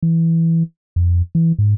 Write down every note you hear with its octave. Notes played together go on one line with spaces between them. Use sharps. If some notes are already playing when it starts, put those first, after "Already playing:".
E3
F2
E3
G#2